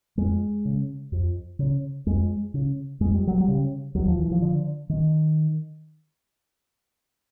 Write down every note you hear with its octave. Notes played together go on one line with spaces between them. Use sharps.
F2 G#3
C#3
F2
C#3
F2 G#3
C#3
F2 G#3
G3
F#3
G3
C#3
D#2 F#3
F3
E3
F3
D3
D#3